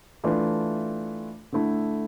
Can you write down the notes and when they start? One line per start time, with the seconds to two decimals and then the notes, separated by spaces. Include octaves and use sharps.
0.24 E3 A3 D4 F4
1.52 D3 A3 E4